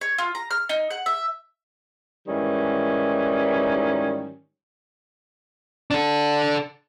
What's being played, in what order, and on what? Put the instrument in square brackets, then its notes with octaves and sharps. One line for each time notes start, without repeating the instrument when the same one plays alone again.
[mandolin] C#5
F4
A#5
F6
D#4
F#5
E5
[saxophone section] G#2 D#3 E3 G3 C#4
[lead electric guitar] D4 A4